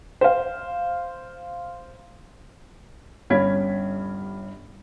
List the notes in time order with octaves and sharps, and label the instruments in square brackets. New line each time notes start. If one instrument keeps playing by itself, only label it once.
[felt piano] C5 F5
G1 G2 C#4 G#6 B6